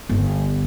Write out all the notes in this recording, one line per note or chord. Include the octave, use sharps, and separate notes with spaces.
G1